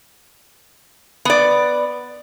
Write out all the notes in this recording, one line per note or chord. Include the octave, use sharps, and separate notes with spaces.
B3 D5